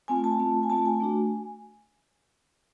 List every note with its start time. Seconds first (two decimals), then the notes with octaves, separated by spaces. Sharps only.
0.08 A3 C4 F4 G#5
0.24 A5
0.39 A3 C4 F4
0.63 G#5
0.70 A3 C4 F4 A5
0.85 G#5
1.00 A3 D4 F#4